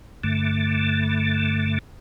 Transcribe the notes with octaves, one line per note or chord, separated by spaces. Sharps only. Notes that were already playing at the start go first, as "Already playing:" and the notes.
G2 D3 A3